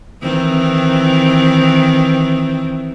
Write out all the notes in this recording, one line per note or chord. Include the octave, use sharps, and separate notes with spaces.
D#3 E3 C4